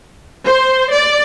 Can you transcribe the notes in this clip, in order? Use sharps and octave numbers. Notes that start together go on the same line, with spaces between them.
C5
D5